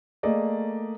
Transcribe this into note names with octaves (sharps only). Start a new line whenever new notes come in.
A3 A#3 G#4 D5 D#5